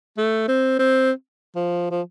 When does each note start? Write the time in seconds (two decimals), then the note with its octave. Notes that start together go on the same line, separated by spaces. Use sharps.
0.18 A3
0.48 C4
0.79 C4
1.55 F3
1.91 F3